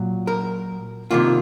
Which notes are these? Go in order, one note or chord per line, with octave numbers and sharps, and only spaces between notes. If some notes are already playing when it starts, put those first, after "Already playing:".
Already playing: A#2 F#3
A#4
C3 D#3 A#3 F4